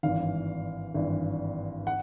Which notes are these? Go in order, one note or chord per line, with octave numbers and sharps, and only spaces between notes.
G#1 G2 E3 F5
G#1 G2 E3
F#5